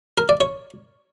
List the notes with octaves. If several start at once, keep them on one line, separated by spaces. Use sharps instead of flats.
A#4
D5
C#5